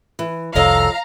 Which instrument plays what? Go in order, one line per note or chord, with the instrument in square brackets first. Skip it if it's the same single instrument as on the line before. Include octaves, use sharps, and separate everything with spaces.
[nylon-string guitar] E3
[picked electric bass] F1 C2 [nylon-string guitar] F3 C#5 D#5 [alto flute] A4 [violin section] F5 A#5